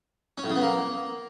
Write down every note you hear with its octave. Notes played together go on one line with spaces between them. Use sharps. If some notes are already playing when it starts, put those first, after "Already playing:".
C#4
A2
C#3
B3
A#3